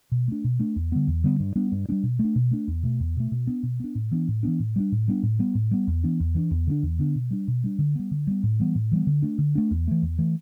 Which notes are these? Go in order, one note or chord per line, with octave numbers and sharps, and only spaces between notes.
B2
A3 D4
B2
A3 D4
E2
D3 G3 B3
E2
D3 G3 B3
G2
G3 B3 D4
G2
G3 B3 D4
B2
A3
D4
B2
A3 D4
E2
B2 A3
E2
B2 A3
B2
B3 D4
B2
B3 D4
A2
E3 B3 D4
A2
E3 B3 D4
A2
G3 B3 D4
A2
G3 B3 D4
A2
G3 B3
A2
G3 B3
E2
E3 B3 D4
E2
E3 B3 D4
E2
D3 B3 D4
E2
D3 B3 D4
B2
G3 D4
B2
G3 D4
D3
G3 B3
D3
G3 B3
A2
E3 G3 B3
A2
E3 G3 B3
D3
A3 D4
D3
A3 D4
E2
E3 A3
E2
E3 A3